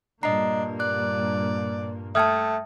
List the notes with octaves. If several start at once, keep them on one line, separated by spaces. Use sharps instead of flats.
G2 A#2 A#3 D4 D#5 A#5 C7
D5 F#6
A3 E5 G5 A5 D#6 F6 G#6